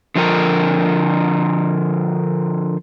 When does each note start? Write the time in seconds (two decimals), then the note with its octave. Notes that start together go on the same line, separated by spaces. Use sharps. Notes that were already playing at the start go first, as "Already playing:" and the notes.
0.16 D3 F3 A#4